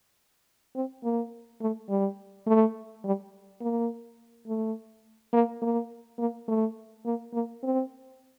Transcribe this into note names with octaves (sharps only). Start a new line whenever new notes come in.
C4
A#3
A3
G3
A3
G3
A#3
A3
A#3
A#3
A#3
A3
A#3
A#3
C4